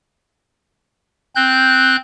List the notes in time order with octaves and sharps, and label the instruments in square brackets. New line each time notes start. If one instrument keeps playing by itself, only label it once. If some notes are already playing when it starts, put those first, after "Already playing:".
[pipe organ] C4 F#6 G6